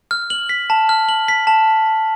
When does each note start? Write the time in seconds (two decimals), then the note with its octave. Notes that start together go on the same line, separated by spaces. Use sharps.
0.11 F6
0.30 F#7
0.49 B6
0.70 A5
0.89 F6
1.09 F#7
1.28 B6
1.47 A5